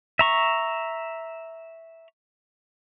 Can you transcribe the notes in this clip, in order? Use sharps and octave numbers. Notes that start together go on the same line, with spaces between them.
E5 A#5 C#6